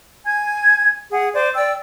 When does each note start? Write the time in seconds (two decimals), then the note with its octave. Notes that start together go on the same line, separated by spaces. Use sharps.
0.24 G#5 G#6
1.11 G#4 F#5
1.33 C5 D5
1.54 D5 G5 E6